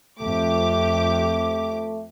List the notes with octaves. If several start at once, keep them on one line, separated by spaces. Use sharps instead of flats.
F2 A3 G4 D6